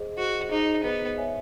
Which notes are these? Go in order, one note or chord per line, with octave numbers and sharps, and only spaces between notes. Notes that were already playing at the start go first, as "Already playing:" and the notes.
Already playing: G#4 C5 D#5
F#4 G#4 C5 D#5
D#4 G#4 C5 D#5
B3 G#4 C5 D#5
C#5 E5 G#5